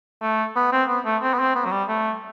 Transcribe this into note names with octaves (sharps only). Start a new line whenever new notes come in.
A3
B3
C4
B3
A3
C4
B3
C4
B3
F#3
G3
A3